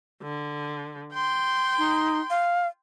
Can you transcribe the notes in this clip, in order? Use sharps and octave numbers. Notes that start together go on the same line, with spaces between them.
D3
G5 C6
D#4
F5